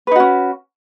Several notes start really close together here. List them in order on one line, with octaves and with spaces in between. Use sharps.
B4 D#4 F#4 C#4